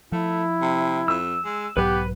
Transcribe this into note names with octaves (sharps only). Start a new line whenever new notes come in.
F3 A3 E4
C3
F2 E6
G#3
B1 G#2 F#3 B3 G4 B4